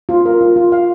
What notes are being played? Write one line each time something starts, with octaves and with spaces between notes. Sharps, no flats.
F4
A#4
F4
F4
F5